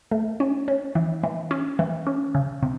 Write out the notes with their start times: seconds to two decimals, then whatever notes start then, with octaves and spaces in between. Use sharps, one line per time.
0.11 A3
0.40 C#4
0.68 C#4
0.95 E3
1.23 E3
1.51 C#4
1.79 E3
2.07 C#4
2.35 C#3
2.63 C3